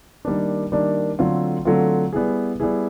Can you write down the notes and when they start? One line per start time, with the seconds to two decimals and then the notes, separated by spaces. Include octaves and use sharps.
0.25 D#3 G3 A#3 D4
0.72 D#3 G3 A#3 D4
1.19 D3 F#3 A3 C4 F4
1.65 D3 F#3 A3 C4 F4
2.13 G3 B3 E4 G#4
2.60 G3 B3 E4 G#4